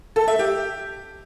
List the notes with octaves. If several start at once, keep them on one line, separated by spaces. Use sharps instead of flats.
A4
E5
G4